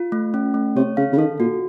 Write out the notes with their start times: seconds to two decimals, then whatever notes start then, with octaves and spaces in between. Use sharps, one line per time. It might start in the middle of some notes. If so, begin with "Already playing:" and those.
Already playing: F4
0.12 A3
0.34 C#4
0.54 A3
0.76 C3 C#5
0.97 C#3 F5
1.13 C#3
1.18 D#3 A4
1.40 A#2 F#4